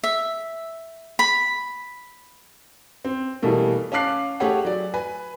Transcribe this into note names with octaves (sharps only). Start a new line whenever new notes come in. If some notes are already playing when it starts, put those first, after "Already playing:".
E5
B5
C4
B2 E3 G3 A3 A#3
C#4 F5 A5 D6 F#6 C7
A3 G4 G#4 C#5 F#5
F#3 D5
B4 G#5